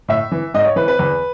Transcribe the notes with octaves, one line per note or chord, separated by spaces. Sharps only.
A2 E5
E3
G#2 D#5
C#5
E3 B4
B4
E2